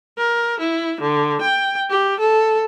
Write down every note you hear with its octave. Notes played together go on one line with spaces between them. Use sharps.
A#4
E4
D3
G5
G4
A4